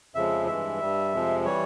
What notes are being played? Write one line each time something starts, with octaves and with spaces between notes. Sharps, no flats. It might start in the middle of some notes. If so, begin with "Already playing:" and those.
F2 C#3 F3 G#3 E5
G2 E3 G#3 E5
G2 G3
F2 C3 F3 G#3
E3 G3 C#5